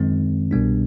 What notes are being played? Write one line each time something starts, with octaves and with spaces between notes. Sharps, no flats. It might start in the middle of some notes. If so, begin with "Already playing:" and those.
Already playing: F#2 D#3 G#3 C4
C2 B2 G3 B3 D4